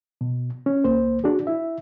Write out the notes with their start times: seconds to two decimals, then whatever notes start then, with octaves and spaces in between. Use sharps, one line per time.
0.21 B2
0.66 C#4
0.84 C#2 A#3 C5
1.24 D4 F#4 G#4
1.47 E4 E5